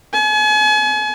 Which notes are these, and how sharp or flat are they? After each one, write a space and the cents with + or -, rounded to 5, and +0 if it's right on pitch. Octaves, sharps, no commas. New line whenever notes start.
G#5 +40